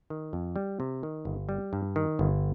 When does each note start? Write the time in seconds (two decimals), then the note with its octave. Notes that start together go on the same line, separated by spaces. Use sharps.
0.10 D#3
0.33 F2
0.56 G3
0.80 C3
1.03 D#3
1.25 G1
1.49 G3
1.73 G2
1.96 D#3
2.19 G1